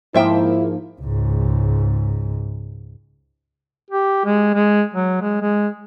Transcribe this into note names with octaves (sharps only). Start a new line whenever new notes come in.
G#2 F3 A#3 E4 C5 E5 G5
C#2 G#2
G4
G#3
G#3
F#3
G#3
G#3